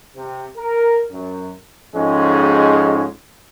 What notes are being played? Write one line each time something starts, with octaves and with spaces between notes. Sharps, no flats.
C3
A#4
F#2
F2 G#2 G#3 C#4